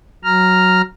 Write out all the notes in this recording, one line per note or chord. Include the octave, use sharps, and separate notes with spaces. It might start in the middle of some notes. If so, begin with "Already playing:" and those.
F#3 A#5 F6